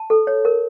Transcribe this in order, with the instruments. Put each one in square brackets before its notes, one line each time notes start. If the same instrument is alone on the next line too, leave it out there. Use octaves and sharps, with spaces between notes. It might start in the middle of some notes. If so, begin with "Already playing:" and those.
Already playing: [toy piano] A5
A4
C#5
A#4